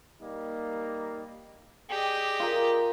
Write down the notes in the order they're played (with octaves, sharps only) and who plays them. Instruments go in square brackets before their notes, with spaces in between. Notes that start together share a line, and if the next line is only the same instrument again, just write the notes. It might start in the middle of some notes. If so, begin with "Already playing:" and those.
[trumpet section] G3 A#3 D#4
[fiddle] G4 D#5 [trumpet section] G#4 D5 G5
[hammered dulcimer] F4 A#4